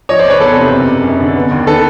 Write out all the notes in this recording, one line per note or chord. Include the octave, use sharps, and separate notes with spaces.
F3 C#5 D#5
C5 D5
F1
B4 C#5
E2 A4 B4
C3
F#1
F#1
F#2
D3
B3
D#2
D#3 A4 B4